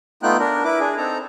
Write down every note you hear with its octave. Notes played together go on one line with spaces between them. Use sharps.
A3 B3 D#4 F4 G5 F#6
D4 A#4
E4 B4 D6
D4 G#4
C4 D#4 A4 A#5